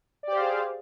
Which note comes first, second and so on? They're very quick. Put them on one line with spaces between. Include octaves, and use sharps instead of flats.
D5 G4 C5 F5 G#4